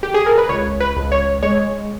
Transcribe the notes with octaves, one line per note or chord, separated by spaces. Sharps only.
G4
G#4
A#4
B4
C#2 C#5
B4
C#2
C#5
G#3 C#5